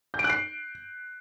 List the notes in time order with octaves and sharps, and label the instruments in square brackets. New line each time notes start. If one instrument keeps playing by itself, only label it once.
[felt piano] G6
D7
F#6
C7